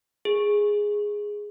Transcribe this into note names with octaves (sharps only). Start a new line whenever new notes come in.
G#4